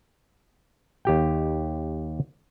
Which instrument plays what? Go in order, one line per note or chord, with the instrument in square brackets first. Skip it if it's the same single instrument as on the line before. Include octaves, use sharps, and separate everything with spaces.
[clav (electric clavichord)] D#2 G4 G5